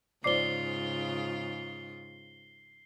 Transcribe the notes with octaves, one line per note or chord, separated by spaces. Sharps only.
G#2 C#3 F4 C5 D5 D6 C7 G7